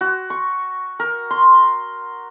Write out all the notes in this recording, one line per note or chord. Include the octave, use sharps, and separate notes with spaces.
F#4
C#6
A#4
C6